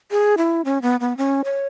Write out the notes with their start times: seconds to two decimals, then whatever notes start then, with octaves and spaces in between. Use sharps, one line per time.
0.11 G#4
0.37 E4
0.65 C#4
0.82 B3
1.00 B3
1.17 C#4
1.44 C#5